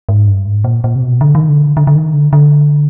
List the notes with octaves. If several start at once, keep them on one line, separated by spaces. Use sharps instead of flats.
G#2
G2
G#2
A#2
A#2
C3
B2
D3
D#3
D3
D3
D3
D#3
D3
D3